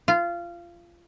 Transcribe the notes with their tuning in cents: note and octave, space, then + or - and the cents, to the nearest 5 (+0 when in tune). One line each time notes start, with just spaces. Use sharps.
F4 -20